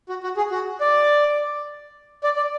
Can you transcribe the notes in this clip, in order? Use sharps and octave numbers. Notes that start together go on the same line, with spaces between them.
F#4
F#4
G#4
F#4
D5
D5
D5